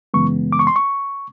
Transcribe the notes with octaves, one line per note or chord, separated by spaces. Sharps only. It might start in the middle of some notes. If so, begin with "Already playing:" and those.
F#2 C#3 E3 G#3 B3 C#6
D6
C#6
C6
C#6